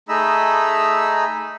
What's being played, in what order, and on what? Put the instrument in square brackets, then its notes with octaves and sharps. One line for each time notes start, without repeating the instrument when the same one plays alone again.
[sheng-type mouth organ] A3 D#4 G#4 D#5 B5 E6